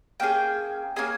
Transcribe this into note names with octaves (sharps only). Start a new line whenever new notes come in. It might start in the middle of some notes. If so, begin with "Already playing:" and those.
A#3 C#4 G#4 G5
A#3 C#4 G#4 G#5